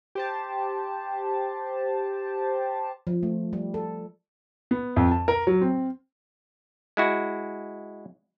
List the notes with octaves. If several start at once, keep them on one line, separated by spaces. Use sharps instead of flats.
G4 C5 A5
F3
A3
G3
A4
B3
F2
A5
A#4
F#3
C4
G#3 E4 F#4